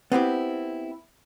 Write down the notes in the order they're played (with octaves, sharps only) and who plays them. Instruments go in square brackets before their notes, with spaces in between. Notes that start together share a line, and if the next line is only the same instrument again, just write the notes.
[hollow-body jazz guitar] B3 C4 E4 G4